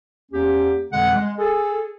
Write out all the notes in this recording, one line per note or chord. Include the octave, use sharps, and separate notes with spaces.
E2 A#3 C#4 G4
F2 B2 D3 E3 G#3 F#5
G#3
G#4 A4